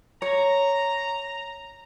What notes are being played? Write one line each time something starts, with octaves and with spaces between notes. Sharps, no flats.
C#5 A#5